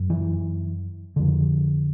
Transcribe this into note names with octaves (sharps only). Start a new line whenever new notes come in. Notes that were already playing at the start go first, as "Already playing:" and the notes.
Already playing: F#2
E3
F2 D3